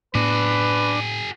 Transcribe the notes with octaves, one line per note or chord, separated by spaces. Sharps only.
A2 B3 D4 F#4 G#4 B4